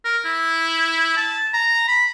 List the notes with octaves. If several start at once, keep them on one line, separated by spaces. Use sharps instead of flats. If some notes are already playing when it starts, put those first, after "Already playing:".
A#4
E4
A5
A#5
B5